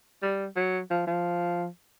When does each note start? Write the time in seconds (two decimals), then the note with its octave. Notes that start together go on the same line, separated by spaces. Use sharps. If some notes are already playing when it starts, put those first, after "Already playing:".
0.23 G3
0.56 F#3
0.91 F3
1.07 F3